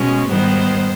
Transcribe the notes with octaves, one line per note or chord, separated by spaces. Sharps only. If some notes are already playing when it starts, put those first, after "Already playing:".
Already playing: B2 G#3 C#4
G#2 D#3 G3 B3 C5